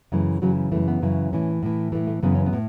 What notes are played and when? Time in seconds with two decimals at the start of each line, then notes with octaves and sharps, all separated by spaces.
0.12 F#2 C#3 E3 A3
0.42 F#2 C#3 E3 F#3
0.72 F#2 C#3 E3 A3
0.88 B3
1.02 F#2 C#3 E3
1.33 A2 E3 C#4
1.63 A2 E3
1.92 A2 E3 A3
2.07 A3
2.23 F#2 C#3 E3 B3
2.35 C#4
2.46 B3
2.53 A2